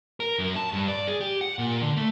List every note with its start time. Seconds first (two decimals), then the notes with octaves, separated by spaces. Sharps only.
0.20 A#4
0.39 F#2
0.56 A5
0.72 G2
0.88 D5
1.07 G#4
1.21 G4
1.41 F#5
1.59 A#2
1.83 D3
1.97 A3